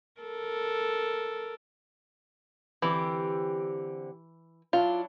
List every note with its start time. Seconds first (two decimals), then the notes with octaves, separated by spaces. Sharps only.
0.21 A4 A#4
2.82 D3 E3 C4 G4
4.73 F#3 D4 E4 F4